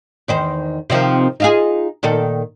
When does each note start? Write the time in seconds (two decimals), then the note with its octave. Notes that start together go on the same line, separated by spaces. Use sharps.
0.28 E2 D#3 C5
0.90 C3 D#3 F3
1.40 D#4 F4 G#4
2.03 A#2 D#3 A4